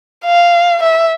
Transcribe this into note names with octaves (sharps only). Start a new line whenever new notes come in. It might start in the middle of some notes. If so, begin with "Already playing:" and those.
F5
E5